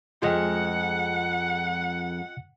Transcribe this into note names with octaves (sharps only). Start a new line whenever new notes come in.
F2 G#3 F4 D#5 F#5 G5